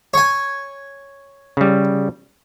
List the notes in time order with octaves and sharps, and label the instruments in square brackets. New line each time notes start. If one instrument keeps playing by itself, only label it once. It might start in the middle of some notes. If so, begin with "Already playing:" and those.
[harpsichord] C#5 G#5
[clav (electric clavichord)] C#3 G3